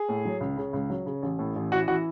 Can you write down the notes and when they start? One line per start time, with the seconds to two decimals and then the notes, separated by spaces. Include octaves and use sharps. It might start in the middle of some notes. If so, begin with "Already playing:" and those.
Already playing: G#4
0.09 A2
0.25 F#3
0.40 C#2
0.57 C#3
0.73 C#2
0.90 F#3
1.06 C#3
1.22 A1
1.39 A2
1.56 A1
1.72 E3 F#4
1.88 E3 F#4